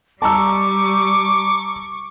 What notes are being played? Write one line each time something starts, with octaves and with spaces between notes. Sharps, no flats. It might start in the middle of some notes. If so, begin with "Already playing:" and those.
G3 A5 A#5 C#6 D6 E6